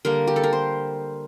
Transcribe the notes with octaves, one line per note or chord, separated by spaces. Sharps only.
D3 G3 A#3 A#4
G4
A4
A#4
C5